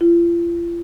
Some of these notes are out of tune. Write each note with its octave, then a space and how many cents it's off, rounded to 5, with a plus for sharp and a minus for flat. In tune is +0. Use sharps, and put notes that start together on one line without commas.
F4 -40